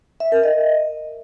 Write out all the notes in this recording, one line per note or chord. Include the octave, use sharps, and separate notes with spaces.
E5
A#4
D#5